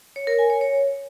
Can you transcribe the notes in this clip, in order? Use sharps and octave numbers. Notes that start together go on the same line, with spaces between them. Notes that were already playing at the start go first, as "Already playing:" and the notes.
C#5
A#4
G#5
C#5
C#5